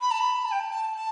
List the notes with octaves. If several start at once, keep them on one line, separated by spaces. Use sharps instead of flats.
B5
A5
B5
A5
G5
A5
A5
A5